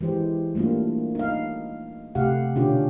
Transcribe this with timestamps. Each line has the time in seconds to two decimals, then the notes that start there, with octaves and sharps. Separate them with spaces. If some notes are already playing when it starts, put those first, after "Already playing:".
0.01 E3 G#3 G4 C5
0.55 G3 A3 A#3 D4 F4
1.15 D#4 F5
2.15 C3 A3 G4 F5 F#5
2.55 B2 D3 C#4 D4 F4 G4